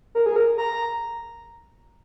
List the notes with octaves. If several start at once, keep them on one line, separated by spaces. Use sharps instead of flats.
A#4
G#4
A#4
A#5